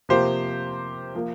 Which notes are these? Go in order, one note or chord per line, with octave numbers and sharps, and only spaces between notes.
C3 F3 A#3 G4 C5
F3 A#3